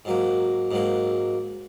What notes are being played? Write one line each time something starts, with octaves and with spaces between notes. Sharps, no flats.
G#2 F#3 A#3
G#2 F#3 A#3